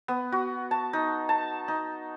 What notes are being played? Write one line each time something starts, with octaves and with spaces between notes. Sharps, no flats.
B3
F#4
A5
D#4
A5
D#4